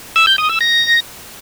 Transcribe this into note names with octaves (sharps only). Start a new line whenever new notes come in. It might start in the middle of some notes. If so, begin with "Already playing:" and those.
E6
G6
D#6
E6
A#6